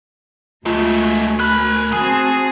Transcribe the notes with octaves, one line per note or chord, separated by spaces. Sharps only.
D2 B2 G#3 A3 F4 G#5
A#4 B5 F#6
C4 F#4 G#4 G#5 A5